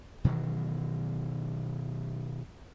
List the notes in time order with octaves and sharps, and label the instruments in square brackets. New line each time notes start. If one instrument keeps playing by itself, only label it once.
[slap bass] B2 D#3 E3 F#3